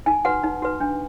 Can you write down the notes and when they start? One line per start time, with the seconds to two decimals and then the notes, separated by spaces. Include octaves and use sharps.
0.06 D#4 G#5
0.25 F#4 B4 F#5
0.44 D#4
0.62 F#4 B4
0.80 D4